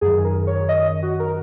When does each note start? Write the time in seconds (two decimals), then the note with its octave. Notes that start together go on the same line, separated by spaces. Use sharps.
0.01 F#2 D#3 G#4
0.25 A#4
0.47 C#5
0.69 D#5
1.03 F#4
1.20 A#4